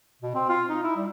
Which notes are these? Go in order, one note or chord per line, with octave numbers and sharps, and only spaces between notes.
B2
C4
F4
D#4
E4
G3